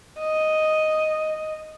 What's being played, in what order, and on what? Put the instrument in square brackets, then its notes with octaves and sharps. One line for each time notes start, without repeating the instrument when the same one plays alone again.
[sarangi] D#5